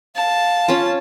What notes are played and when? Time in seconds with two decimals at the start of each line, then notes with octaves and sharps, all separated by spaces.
0.16 F5 A5
0.68 C#4 F4